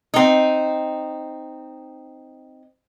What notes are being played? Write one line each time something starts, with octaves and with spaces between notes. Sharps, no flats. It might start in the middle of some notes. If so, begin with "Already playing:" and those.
C4 D#4